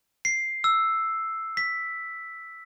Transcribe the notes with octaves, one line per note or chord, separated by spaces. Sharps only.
C7
E6
B6